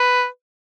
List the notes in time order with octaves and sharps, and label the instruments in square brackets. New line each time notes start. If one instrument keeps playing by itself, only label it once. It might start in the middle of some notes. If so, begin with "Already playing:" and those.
Already playing: [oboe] B4